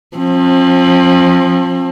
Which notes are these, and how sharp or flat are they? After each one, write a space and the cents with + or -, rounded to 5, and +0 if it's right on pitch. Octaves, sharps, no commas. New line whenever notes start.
F3 +20 C4 +40